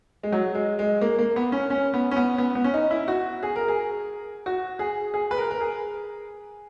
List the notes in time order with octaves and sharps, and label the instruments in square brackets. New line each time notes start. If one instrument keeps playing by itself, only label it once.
[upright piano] G#3
F#3
G#3
G#3
A#3
A#3
B3
C#4
C#4
B3
C#4
B3
B3
B3
C#4
D#4
E4
F#4
G#4
A#4
G#4
F#4
G#4
G#4
B4
A#4
A#4
G#4